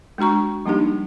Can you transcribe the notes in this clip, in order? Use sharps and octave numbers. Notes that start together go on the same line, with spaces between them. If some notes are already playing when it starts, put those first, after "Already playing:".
G#3 D4 F#4 A#5 C#6
F3 G3 A#3 D4 D#4 G4